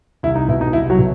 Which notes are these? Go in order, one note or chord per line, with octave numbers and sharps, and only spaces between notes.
C2 E4
D#4
B2 E4
D#4
C2 E4
F#3 F#4
B2